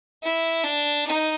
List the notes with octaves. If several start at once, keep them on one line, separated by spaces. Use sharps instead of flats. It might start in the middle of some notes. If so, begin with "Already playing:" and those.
E4
D4
D#4